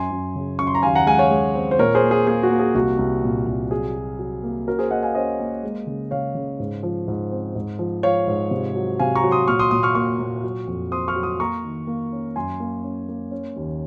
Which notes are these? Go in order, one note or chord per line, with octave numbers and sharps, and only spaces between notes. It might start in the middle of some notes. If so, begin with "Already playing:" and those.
Already playing: F#2 G#5 C6
F#2
C#3
F#2 C#6
C6
A#5
D#2 F5 G#5
F#5 A#5
G#3 F5 G#5
F#5
C#5 F5
G#3
C4
C5
A#2 A#4 C#5
G#4 C5
A#3
G#4
A#3 G#4
F#4
A#3
G#4
C2 F#4
C2
A#2
C2
F#3 G#4
F#3
F#3
A#3
C#4 F#4 A#4
G#4 C5
A#3 D#5 F#5
F5 G#5
C#4 C5 D#5
A#3
G#3
C#3
C#3 C#5 F5
C#3
G#2
F3
G#2
C4
G#2
F3
F3 C#5 F5
G#2
C3
F#3
C3 F5 G#5
A#5 C#6
F#3
C6 D#6
A#2 C#6 F6
C6 D#6
A#2 C6 D#6
C#6 F6
A#3 C#6 F6
A#2
F#3
F2
C4 C6 D#6
C#6 F6
F#3
C6 D#6
A#3 A#5 C#6
D#3
A#3
C#4
F#2 G#5 C6
A#3
C#4
A#3
C#4
D#2